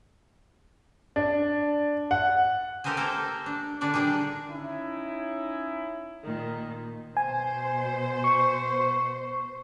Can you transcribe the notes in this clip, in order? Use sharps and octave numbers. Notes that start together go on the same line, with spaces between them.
D4
F#5
G4 A4 A#4 C5 D#5 G#5
A#3 A4 A#4 C5 G5
D4
D3 D4 D5 G#5
D#3 G3 D4 D#4 G#4
C#4 D#4 E4
A#2 D#3
B2 C5 G#5
C#6